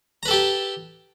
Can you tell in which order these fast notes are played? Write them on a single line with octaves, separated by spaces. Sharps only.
A#5 B4 A4 G4 A5